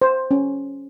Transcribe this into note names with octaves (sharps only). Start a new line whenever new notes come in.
C5
C#4